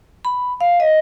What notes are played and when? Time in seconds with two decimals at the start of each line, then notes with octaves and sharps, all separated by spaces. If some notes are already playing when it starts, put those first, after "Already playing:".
0.25 B5
0.61 F5
0.80 D#5